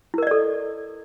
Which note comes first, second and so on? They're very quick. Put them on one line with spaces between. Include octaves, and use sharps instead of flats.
E4 A#4 D#5 D5 A4